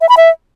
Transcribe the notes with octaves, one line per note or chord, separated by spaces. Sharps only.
E5
B5
E5